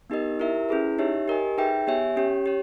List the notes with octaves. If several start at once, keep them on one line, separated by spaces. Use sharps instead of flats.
B3 D#4 G4 A#4 D#5
E4 G4 A#4 E5
C#4 E4 G#4 B4
D#4 G4 C#5 E5
G4 A#4 D#5 G#5
D#4 G#4 B4 E5 G5
B3 G4 C#5 E5 G#5
C#4 G4 C#5
G4 C#5